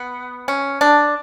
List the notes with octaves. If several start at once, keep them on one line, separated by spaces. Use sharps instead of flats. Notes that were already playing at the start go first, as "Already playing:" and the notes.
Already playing: B3
C#4
D4